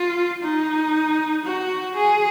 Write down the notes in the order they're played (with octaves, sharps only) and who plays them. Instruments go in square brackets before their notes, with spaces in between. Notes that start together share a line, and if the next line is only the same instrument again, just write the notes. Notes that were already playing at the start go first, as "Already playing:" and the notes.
Already playing: [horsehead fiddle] F4
D#4
F#4
G#4